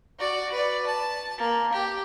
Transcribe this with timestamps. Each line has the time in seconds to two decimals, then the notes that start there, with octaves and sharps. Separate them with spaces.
0.19 F#4 D5
0.52 B4 D5
0.86 A5
1.38 A#3
1.73 G4